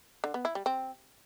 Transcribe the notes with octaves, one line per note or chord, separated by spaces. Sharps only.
D3
B3
E4
G3
C4